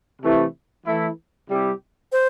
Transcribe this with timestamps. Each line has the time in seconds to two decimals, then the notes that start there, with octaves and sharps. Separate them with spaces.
0.22 C3 E3 A3 E4
0.85 E3 A3 E4
1.49 C3 G3 E4 G4
2.12 C5